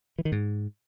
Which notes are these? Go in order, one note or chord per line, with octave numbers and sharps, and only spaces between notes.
E3
D#3
G#2